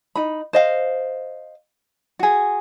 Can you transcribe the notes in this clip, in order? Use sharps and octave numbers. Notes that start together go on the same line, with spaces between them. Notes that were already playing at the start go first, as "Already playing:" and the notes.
D#4 B5
C5 D#5 F5
F#4 G#4